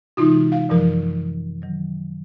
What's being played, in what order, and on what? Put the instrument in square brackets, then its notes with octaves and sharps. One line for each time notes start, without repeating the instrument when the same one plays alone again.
[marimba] C3 E3 G#3 [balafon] D#4 F4 F#4
[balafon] F5
[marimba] F#2 [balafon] E3 F3 A#4
[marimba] D#3 F#3